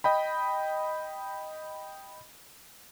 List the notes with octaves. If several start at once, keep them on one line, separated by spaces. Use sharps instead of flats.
D#5 G5 B5